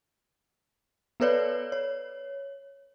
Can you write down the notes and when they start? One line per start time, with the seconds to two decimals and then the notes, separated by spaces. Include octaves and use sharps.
1.20 B3 A4 B4 C#5 D5
1.72 C#5